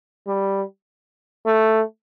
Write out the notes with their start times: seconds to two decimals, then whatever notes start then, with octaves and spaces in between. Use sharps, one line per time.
0.27 G3
1.46 A3